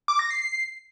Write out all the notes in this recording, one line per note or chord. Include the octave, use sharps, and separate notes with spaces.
D6
A#6
C7
C7